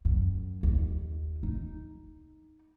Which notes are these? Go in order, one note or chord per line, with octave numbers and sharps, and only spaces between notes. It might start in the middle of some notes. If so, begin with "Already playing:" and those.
F#2
D#2
D#4